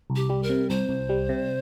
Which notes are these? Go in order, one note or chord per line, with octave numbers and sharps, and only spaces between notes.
C2
G4
G3
A#4
C3
C2 C5
C2
G3
C3